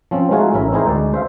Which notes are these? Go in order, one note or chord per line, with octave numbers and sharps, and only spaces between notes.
F3 C4 C#4
G#3 A3 D#4 F4 F#4 G#4
A1 C#4 E4 A#4 E5
C4 D#4 E4 G#4 A#4 C5
D2 G#3 D5
C5 E5 F5